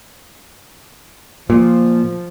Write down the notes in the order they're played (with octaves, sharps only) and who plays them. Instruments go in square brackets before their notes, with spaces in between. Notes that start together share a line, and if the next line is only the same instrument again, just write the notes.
[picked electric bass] A#2 [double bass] F3